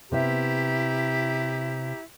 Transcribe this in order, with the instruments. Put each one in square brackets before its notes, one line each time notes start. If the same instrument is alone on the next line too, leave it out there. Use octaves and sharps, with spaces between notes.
[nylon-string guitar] C3 B3 E5 [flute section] E4 G4 A#5